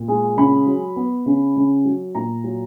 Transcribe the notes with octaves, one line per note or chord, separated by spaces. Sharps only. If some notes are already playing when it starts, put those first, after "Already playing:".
Already playing: A#2
G#3
C#3 B5
F#3
B3
C#3
C#3
F#3
A#2 A#5
F#3